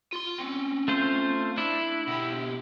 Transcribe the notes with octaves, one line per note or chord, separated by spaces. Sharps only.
F4 C6
C4 C#4
A3 F4 C5
D4 E4
B2 G4